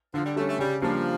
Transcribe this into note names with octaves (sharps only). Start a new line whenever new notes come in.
D3 F3
G3
G3 A3 C#4
A3
C#3 G3
F3 G3 A#3 D4